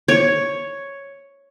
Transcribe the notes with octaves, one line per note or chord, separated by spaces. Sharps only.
C#5